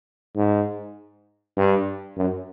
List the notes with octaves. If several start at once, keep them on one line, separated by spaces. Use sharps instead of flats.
G#2
G2
F#2